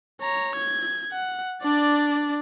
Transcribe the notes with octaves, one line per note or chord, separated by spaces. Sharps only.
C#5 A#5
G#6
F#5
D4 D5